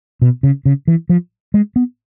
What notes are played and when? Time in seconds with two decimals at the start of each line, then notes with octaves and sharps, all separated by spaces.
0.22 B2
0.43 C#3
0.65 C#3
0.88 E3
1.09 F3
1.54 G#3
1.76 B3